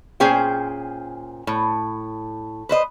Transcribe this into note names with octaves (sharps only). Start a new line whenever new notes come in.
A#2 C#4 G#4 C5 G5
A2
B4 C5 D#5